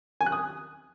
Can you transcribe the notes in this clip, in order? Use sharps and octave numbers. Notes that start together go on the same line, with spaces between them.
G#5
F#6
D#6